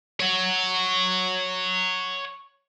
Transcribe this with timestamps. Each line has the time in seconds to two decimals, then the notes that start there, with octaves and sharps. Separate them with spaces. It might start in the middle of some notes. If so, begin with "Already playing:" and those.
0.20 C#5 F#5